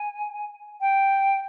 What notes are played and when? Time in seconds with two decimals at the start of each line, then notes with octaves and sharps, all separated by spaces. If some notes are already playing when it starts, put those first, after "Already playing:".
Already playing: G#5
0.80 G5